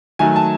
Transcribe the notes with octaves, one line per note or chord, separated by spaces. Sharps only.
D#3 F#3 A3 G#5
A5